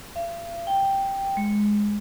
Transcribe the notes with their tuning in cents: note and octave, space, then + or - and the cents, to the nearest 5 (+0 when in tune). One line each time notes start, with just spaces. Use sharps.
F5 -45
G5 +0
G#3 +0